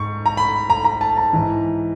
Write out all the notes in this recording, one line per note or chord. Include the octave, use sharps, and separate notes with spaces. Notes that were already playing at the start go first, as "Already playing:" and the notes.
Already playing: G#2 C#6
A#5
B5
A#5
A#5
A5
A#5
G#2 E3